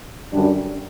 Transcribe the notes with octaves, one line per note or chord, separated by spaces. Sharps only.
F#2 D3 G3 D4